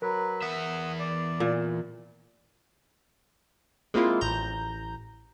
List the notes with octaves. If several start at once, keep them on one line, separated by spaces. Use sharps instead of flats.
F#3 A#4 B4
E2 E5 F#5 D#6
D5
A#2
G#3 A#3 C4 E4 F4
A1 A#5 G6